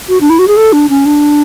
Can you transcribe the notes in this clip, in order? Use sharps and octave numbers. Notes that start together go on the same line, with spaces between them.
F#4
D4
E4
F#4
G#4
A4
D4
C#4
D4